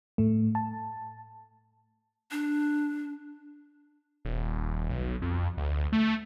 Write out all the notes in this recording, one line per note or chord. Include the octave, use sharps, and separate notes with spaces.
A2 A3
A5
D4
D#1
B1
F2
D2
A3